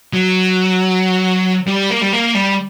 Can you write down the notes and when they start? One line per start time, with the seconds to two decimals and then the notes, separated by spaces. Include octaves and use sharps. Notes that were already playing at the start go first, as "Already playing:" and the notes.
0.13 F#3
1.68 G3
1.91 A#3
2.02 G3
2.13 A#3
2.35 G3